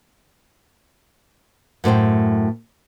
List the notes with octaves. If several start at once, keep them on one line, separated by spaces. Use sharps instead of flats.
F#2 A2 C5 G5